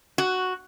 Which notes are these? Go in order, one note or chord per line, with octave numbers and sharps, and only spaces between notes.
F#4